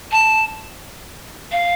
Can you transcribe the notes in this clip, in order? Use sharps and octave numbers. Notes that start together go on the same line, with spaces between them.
A5
F5